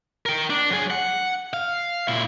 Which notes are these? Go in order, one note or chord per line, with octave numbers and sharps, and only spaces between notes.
A#4 G5
D4
F#3 G#4
F#5
F5
A#2 E4